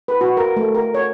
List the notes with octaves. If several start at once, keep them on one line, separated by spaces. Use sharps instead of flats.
B4
F#4
A#4
A3
A#4
C#5